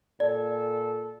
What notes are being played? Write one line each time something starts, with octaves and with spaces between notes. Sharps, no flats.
A#2 A4 D5